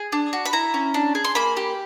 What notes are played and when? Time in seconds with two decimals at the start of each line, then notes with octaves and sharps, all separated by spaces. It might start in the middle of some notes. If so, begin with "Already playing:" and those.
Already playing: G#4
0.12 D4
0.33 F#4
0.45 B5
0.53 E4 A#5
0.74 C#4
0.94 D4
1.15 G#4
1.24 C6
1.35 A#3 B5
1.57 G4